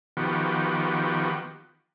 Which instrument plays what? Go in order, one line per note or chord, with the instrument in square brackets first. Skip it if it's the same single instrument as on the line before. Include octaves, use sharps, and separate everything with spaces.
[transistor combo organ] D#3 F3 B3 F#4 G4